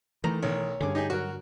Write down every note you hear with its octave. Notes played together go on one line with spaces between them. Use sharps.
D#3 E3 A3 A#5
B1 D#3 C#5
G2 D3 C#4 G#4 D6
D#4 G4 G#4
F#3 F#4 A#4